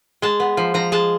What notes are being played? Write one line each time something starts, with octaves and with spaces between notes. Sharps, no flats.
G#3 A5
B3
F3
F3 A#5
G#3 A5